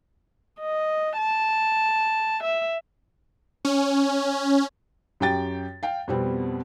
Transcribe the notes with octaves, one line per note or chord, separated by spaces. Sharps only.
D#5
A5
E5
C#4
F#2 G4 G5 A6
F5 G5
F2 B2 G3 B3 C4